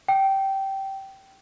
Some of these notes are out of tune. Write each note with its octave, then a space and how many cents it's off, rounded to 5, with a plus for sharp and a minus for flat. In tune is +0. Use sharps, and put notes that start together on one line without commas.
G5 -15